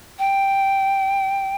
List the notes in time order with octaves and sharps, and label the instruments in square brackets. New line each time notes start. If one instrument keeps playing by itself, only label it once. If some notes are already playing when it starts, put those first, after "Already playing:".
[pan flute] G5